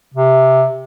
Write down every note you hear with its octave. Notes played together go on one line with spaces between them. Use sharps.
C3